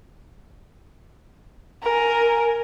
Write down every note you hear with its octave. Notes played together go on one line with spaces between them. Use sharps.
A#4 G#5